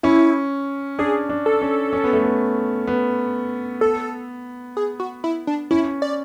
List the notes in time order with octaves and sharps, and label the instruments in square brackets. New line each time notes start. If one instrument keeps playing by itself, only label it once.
[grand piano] C#4 [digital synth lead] E4
[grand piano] D4 [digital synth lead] G#4
[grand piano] D4
[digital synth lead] A4
[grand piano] C#4
C#4
B3
A3
B3
B3
[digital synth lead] A4
G#4
F#4
E4
D4
[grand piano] C#4 [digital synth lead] E4
[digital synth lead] D5